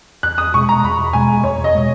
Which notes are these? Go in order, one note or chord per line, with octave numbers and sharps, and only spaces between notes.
E2 F#6
D#6
B2 G#3 C#6
A#5
E2 B5
B2 G#3 G#5
E2 C#5
D#5
B2 G#3